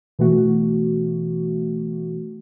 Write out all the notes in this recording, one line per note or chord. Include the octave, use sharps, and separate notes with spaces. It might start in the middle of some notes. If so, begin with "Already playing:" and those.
B2 E3 A3 F#4